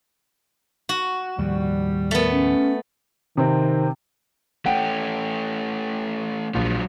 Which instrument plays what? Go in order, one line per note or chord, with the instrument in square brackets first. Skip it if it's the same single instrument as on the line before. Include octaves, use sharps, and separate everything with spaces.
[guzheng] F#4
[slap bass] D#2 A2 F3 [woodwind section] G3
[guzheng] A3 B3
[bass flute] C#4
[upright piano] C3 C4 [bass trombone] D#3
[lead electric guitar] A3 C#4 [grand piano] F#5 G5
[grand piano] A#1 [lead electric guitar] F#3 F4